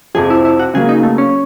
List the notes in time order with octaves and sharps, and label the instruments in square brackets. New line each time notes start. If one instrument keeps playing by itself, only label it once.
[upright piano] F2 C3 F3 [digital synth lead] G#4
[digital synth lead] E4
E4
F#4
[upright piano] C#3 F#3 A#3 [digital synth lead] G#4
[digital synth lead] D#4
A3
C#4